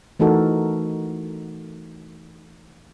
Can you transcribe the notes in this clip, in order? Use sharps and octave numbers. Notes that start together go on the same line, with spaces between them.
E3 A3 D#4 F#4 A4 A#4